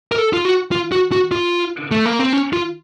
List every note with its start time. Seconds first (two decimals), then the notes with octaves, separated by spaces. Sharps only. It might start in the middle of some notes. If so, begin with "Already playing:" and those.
0.12 A#4
0.18 A4
0.33 F4
0.45 F#4
0.72 F4
0.92 F#4
1.12 F#4
1.32 F4
1.91 A3
2.06 A#3
2.19 C4
2.33 C#4
2.53 F4